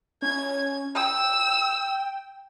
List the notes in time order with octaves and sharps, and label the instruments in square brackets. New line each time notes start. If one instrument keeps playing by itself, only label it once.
[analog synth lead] C#4 [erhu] G#6
[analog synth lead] G5 [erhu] E6